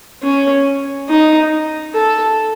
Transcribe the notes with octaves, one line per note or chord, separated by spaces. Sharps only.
C#4
D#4
A4